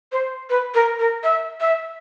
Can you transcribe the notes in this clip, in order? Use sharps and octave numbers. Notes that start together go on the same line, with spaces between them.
C5
B4
A#4
A#4
E5
E5